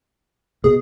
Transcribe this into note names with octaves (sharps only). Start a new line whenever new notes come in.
B2 G#4